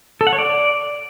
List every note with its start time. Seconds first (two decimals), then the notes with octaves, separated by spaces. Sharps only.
0.21 A4
0.27 F#5
0.33 C#5
0.39 D5